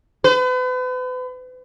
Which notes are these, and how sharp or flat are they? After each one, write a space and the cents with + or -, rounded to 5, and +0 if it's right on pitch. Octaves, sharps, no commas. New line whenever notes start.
B4 +40